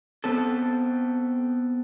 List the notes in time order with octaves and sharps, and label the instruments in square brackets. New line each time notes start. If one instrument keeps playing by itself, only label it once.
[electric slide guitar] B3 C4 A4